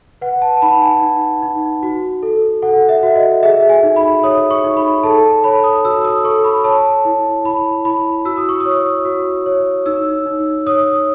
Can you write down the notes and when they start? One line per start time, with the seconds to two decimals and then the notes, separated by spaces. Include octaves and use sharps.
0.21 B4 F#5
0.42 A5
0.57 A5
0.62 D#4 B5
0.82 G#5
1.02 D#4
1.42 D#4
1.83 F#4
2.23 A4
2.62 A4 F#5
2.89 E5
3.03 F#4
3.16 D#5
3.43 G#4 E5
3.69 G#5
3.83 D#4
3.96 B5
4.23 C#5 D#6
4.51 C#6
4.64 D#4
4.77 B5
5.03 A4 A5
5.44 C#5 B5
5.64 D#6
5.85 F#4 E6
6.04 D#6
6.24 A4 C#6
6.44 B5
6.64 C#5 A5
7.05 E4
7.45 E4 B5
7.85 E4 B5
8.25 F#4 E6
8.37 D#6
8.49 C#6
8.60 D#6
8.66 C#5
9.05 F#4
9.46 C#5
9.86 D#4 E6
10.26 D#4
10.66 C#5 D#6